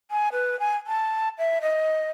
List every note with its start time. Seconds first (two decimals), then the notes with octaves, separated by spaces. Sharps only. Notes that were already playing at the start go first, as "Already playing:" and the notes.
0.10 G#5
0.32 B4
0.59 G#5
0.86 A5
1.38 E5
1.61 D#5